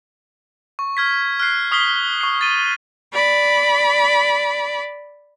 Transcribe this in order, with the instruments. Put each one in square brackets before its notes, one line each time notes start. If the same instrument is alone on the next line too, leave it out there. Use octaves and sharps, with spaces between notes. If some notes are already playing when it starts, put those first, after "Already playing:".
[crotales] C#6
F6 G#6 B6
F6 F#6 C7
C#6 D#6 F6 B6 C7 G7
C#6 C7
A6 D#7
[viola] D5 B5